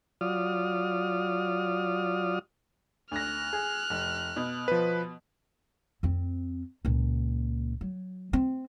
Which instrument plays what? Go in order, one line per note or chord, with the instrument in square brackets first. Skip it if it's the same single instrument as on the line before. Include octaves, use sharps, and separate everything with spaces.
[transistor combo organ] F#3 F4 D5 D#6 F6
[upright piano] D2 A#6 [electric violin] F6 F#6
[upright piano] G#4
F1
B2
[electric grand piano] F3 B4
[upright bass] F2 C4
C#2 A#2
F#3
C4